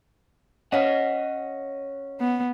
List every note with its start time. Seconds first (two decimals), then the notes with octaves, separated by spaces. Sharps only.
0.72 C#4 D#5 F5 F#5
2.20 B3